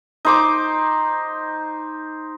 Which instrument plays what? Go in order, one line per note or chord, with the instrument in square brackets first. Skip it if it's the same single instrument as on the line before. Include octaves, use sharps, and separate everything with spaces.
[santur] D#4 C5 D6